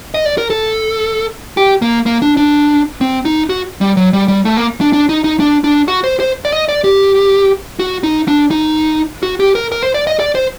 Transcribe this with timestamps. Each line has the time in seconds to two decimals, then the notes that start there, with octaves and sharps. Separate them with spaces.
0.14 D#5
0.26 D5
0.38 A#4
0.50 A4
1.57 G4
1.82 A#3
2.06 A#3
2.22 D4
2.37 D4
3.01 C4
3.25 D#4
3.50 F#4
3.81 G3
3.97 F#3
4.13 G3
4.28 G3
4.45 A3
4.57 A#3
4.81 D4
4.93 D4
5.09 D#4
5.24 D#4
5.40 D4
5.64 D4
5.88 F#4
6.04 C5
6.20 C5
6.45 D5
6.52 D#5
6.69 D5
6.84 G4
7.79 F#4
8.03 D#4
8.28 D4
8.51 D#4
9.23 F#4
9.40 G4
9.55 A#4
9.72 A#4
9.83 C5
9.94 D5
10.07 D#5
10.20 D5
10.35 C5